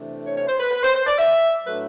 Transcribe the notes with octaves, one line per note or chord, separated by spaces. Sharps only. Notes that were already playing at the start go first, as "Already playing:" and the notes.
Already playing: C3 E3 A3 D4
C#5
C#5
C5
B4
B4
C5
C5
D5
E5
A2 F#3 A3 D4 B4